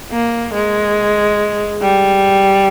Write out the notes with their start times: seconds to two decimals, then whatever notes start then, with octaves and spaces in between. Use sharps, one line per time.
0.12 A#3
0.53 G#3
1.82 G3